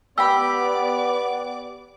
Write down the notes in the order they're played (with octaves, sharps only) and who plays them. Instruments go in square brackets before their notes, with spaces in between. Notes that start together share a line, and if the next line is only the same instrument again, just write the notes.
[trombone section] B3 [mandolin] G4 B5 [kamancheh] D5 D6 [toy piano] G5 E6